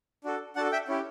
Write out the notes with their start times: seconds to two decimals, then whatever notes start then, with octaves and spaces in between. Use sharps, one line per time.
0.24 D4 F#4 A4
0.56 D4 F#4 A4 F#5 A5
0.72 E5 G5
0.88 C#4 E4 G4